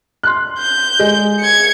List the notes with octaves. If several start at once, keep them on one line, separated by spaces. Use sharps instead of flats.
C6 F#6
G6
G#3
G#6 C#7